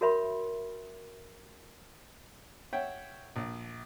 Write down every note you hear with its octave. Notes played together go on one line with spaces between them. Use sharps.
F#4 A#4 C#5 E5 B5 C6
C#5 E5 F#5 G5
A#1